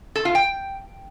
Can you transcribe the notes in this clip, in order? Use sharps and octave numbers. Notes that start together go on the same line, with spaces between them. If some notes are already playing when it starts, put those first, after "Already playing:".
A4
F4
G5